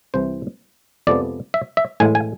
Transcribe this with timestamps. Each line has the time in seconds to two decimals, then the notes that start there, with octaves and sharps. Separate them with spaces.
0.14 C2 C3 E3 C5
1.07 F2 C3 F3 G#3 B3 D5
1.54 E5
1.77 E5
2.00 A2 E3 G#3 G#5
2.15 G#5